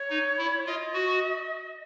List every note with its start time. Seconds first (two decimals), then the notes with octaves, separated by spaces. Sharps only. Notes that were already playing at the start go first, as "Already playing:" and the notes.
Already playing: C#5
0.10 D#4
0.38 E4
0.66 F4 D#5
0.94 F#4